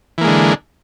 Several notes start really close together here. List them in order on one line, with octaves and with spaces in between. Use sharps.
E3 A#3 G#3 D3